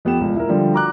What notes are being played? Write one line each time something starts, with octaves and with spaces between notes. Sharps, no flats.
F2 B3 G4 E7
E1 C#2
E4 A#4
D3 F3 G3
F#4 A#5 D6 F#6